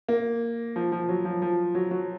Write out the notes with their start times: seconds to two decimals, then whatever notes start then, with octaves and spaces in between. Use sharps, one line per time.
0.09 A#3
0.76 F3
0.92 F3
1.09 F#3
1.25 F3
1.42 F3
1.75 F#3
1.91 F#3